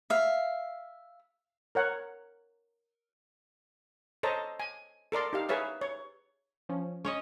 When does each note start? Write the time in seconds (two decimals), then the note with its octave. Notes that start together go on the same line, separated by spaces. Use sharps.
0.10 E5 F5
1.75 A#4 C#5 F#5
4.23 A4 C5 C#5 D#5 A5 A#5
4.60 G#5
5.12 A4 A#4 D5 C6
5.33 D#4 G4 F5
5.49 G#4 B4 C#5 E5 F5
5.81 C#5
6.69 F3 C#4
7.05 C#4 C#5 D#5